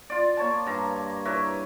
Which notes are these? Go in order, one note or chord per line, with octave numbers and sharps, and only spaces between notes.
F4 D5
A#3 C#5 A5
G2 A#5
E4 A#4 B4 C#5